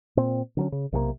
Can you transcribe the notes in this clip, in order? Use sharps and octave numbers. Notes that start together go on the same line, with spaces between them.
A#2 C4
D3 F#3 C#4
C#3
B1 C3 D#3 A#3